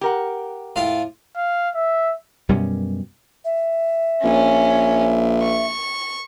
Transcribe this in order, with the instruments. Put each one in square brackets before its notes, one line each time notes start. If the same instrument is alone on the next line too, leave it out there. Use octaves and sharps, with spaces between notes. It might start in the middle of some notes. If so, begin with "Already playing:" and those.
[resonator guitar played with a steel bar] G4 A#4 F#5
[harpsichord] A2 F4 F5
[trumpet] F5
E5
[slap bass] F#2 B2 G3 C#4
[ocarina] E5
[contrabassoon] A#1 [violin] C#4
[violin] C#6